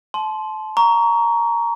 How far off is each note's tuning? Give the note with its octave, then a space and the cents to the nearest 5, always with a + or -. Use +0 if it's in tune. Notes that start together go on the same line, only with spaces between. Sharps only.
A5 -25 C6 +0
A#5 +0 C#6 +25